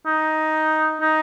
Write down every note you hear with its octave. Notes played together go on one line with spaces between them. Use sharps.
D#4
D#4